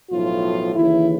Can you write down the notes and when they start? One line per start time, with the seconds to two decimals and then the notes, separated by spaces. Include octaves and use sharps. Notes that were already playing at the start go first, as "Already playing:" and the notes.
0.11 B1 A2 F3 F4
0.75 D#2 C#3 E3 E4